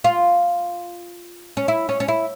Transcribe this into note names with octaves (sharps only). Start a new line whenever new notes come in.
F4
C#4
E4
C#4
C#4
E4